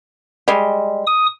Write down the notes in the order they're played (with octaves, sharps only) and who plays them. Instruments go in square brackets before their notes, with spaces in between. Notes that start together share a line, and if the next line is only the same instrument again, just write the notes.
[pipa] G3 G#3
[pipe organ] D#6